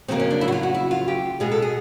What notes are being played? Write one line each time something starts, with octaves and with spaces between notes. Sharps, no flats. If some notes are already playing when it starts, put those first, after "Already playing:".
F2 C#3 F#3 A#3 C4
C#4
D4
E4
F#4
F4
F#4
E4
F4
G4
B2 G#3 B3 G#4
A4
G#4